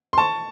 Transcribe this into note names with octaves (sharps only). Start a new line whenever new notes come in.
C6
A5 C#6